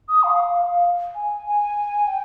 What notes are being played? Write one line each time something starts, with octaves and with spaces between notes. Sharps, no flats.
D#6
F5
F5
G#5
G#5
G5